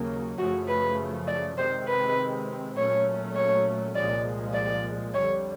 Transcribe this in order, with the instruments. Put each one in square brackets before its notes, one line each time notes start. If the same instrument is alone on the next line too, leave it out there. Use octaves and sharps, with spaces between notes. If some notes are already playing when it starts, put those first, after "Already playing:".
Already playing: [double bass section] D#2 C#3 F#3 A#3 C#4
[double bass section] F#2 C#3 F3 A3 [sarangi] F#4
[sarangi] B4
D5
[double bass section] C3 D#3 G#3 C4 [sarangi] C5
[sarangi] B4
[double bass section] A#2 F#3 A3 C#4 [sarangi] C#5
[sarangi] C#5
[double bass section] C2 A#2 F3 G#3 [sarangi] D5
[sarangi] D5
[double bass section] F2 D3 G3 [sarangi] C#5